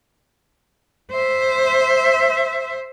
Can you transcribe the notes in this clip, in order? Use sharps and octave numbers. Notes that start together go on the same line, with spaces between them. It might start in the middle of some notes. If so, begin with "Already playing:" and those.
C5 E5